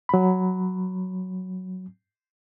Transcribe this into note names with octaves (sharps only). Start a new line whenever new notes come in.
F#3 B5